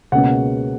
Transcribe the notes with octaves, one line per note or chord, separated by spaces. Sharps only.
C#2 B2 A#3 C#4 F#5